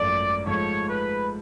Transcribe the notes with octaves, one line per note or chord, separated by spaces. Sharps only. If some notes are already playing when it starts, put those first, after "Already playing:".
Already playing: G#1 F#2 F3 A3 D5
G#2 F3 A3 C#5
B4